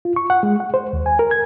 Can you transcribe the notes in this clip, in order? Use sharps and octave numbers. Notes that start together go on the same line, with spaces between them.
F4
C#6
F#5
G#3
F#5
C5
D#2
G#5
A#4
G#6